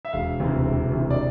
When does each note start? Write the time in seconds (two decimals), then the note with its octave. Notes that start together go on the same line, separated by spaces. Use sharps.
0.05 E5
0.13 E1 F5
0.40 D2 C3 E3
0.65 E1
0.92 D2 C3 E3
1.10 D5